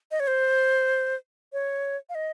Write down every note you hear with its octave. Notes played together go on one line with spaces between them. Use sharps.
D#5
C#5
C5
C#5
F5
D#5